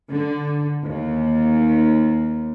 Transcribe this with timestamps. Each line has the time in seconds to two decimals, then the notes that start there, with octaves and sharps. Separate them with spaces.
0.12 D3
0.84 D#2